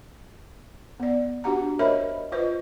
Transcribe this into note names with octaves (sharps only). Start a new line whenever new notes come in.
B3 D5
D4 F#4 G4 F#5 A#5
A#4 C5 C#5 D#5 E5 B5
F4 B4 C5 D#5